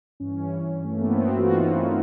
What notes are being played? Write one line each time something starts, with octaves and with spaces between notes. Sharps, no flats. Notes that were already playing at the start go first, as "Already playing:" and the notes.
G2 E3 C#4
A3
A#3
B3
C4
F#4
F4
E4
D#4